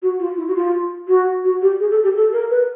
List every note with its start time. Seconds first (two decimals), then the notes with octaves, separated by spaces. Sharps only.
0.02 F#4
0.19 F4
0.37 E4
0.47 F#4
0.54 F4
1.07 F#4
1.44 F#4
1.62 G4
1.80 G#4
1.90 A4
2.03 G4
2.15 A4
2.33 A#4
2.50 B4